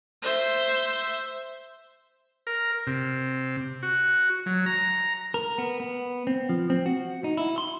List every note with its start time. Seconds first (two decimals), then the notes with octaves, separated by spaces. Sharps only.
0.22 C5 E5
2.47 A#4
2.87 C3
3.83 F#4
4.46 F#3
4.66 A#5
5.34 A#4
5.58 B3
5.80 B3
6.27 C4
6.49 F3
6.70 C4
6.86 F#4
7.24 D#4
7.37 E4
7.58 C6